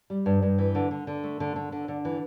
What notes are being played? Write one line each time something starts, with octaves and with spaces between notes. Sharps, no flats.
G3
G2
G2
E3
D3
D3
D3
A3
D3
D3
D3
D3
E3